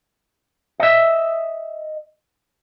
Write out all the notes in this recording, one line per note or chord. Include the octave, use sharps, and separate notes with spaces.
D#5 E5